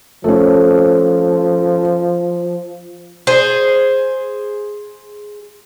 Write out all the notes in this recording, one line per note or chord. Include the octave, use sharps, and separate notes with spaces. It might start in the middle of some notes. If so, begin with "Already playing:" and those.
F3 A3 C#4
G#4 C5